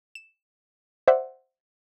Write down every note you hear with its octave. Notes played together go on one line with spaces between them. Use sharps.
E7
C5 D5 E5 F#5